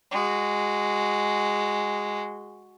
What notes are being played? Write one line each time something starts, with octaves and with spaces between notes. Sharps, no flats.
G#3 F#4